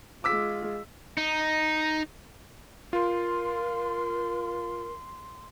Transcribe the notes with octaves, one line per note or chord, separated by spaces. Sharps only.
G#3 F4 D6 E6 B6
D#4
F4 A#4 C6